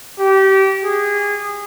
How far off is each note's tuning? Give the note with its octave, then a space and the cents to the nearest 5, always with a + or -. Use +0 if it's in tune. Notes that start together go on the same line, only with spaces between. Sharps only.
G4 -25
G#4 -25